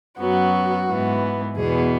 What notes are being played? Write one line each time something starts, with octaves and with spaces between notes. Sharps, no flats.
F#2 F#3 B3 F#4
G#2 E3 B3
E2 B2 B3 G#4